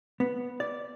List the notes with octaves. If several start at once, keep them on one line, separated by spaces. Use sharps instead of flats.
B3
D5